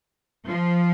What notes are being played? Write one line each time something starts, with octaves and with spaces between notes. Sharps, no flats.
F3